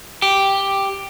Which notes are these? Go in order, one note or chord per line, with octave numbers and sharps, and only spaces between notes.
G4